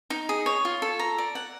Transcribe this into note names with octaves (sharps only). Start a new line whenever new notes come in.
D#4
G#4
C#5
F4
A4
A#5
D5
F#5